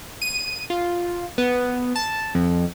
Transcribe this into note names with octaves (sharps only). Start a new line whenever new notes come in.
D#7
F4
B3
A5
F2